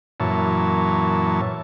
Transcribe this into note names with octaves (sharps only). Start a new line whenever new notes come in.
F#2 A#2 E3 C#5 A5